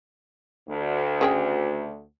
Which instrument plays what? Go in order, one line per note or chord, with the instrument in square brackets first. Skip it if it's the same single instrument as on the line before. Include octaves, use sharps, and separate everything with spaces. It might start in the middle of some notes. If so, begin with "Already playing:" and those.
[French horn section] D2
[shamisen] C#3 G#4 G5